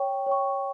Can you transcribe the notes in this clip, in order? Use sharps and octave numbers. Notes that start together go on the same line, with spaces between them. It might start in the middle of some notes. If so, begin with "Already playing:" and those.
Already playing: C#5 G5 C#6
C#5 G5 C#6